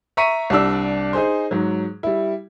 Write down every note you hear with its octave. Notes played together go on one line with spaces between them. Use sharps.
E5 A#5 C#6 B6 C#7 D#7
C2 G3 D4 D5 E6
D#4 G#4 C5
G#2 F#3
G3 E4